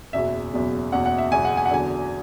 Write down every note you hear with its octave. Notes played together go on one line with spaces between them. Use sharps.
F#1 E2 B2 F#3 E5
F#1 E2 B2 F#3
F#1 E2 B2 F#3 F#5
F#5
E5
F#1 E2 B2 F#3 G#5
F#5
G#5
F#5
E2 D3 F#3 G#5